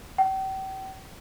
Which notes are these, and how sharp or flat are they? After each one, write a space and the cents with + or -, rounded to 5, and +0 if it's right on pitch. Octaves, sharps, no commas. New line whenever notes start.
G5 -40